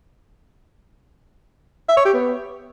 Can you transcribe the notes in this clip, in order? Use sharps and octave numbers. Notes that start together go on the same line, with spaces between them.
E5
C#5
G4
B3